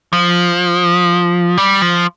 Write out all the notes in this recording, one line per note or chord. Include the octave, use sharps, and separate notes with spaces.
F3
G3
F3